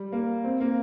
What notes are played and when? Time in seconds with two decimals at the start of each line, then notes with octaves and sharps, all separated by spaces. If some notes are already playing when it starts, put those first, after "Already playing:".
Already playing: G3
0.12 A#3
0.44 C4
0.61 A#3